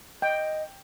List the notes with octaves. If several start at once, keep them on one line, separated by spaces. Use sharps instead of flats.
D#5 G5